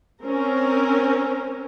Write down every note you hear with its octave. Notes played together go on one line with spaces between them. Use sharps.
C4 C#4 A#4